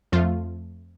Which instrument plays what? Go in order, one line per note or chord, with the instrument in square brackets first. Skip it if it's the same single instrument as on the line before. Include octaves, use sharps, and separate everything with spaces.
[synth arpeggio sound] F2 F3 A3 F4